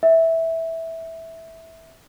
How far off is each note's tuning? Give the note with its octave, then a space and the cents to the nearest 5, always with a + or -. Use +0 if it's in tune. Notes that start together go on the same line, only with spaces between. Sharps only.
E5 -10